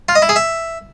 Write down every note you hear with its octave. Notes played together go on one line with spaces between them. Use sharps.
F4
D#5
E4
G#4
E5